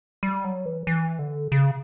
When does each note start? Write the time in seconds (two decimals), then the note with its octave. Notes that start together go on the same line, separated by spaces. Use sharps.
0.23 G3
0.44 F#3
0.66 E3
0.87 E3
1.19 D3
1.52 C#3